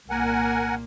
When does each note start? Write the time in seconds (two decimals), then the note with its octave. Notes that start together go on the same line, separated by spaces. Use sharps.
0.10 C2 A#2 A#3 A#4 F#5 G#5